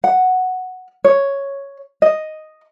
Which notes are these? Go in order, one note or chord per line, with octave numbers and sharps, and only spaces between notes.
F#5
C#5
D#5